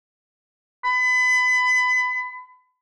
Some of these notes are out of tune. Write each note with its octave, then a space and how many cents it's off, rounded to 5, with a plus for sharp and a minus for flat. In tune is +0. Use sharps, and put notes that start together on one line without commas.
B5 +30